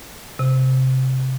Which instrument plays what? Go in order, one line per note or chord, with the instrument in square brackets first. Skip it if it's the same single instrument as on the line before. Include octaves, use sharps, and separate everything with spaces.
[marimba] C3